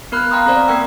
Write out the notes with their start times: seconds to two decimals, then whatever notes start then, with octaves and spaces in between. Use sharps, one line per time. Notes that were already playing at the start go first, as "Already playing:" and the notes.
0.12 B3 A#4 B5 F6 F#6
0.31 F5 G5 A#5 C6 D#6
0.46 C4 A4 C5 D5
0.68 A#3 B3 A#4 G5 E6